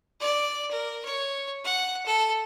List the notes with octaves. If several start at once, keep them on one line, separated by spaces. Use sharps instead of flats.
D5
A#4
C#5
F#5
A4